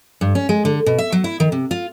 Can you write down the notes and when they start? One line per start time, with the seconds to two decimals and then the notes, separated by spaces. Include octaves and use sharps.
0.21 G2
0.35 C#4
0.49 G#3
0.65 D3
0.86 B2
0.98 E5
1.12 F#3
1.24 E4
1.40 D#3
1.52 C3
1.71 F4